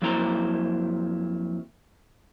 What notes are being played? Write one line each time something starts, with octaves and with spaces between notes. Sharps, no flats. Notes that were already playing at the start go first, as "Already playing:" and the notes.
F2 F#3 A#3 E4 C5 A#5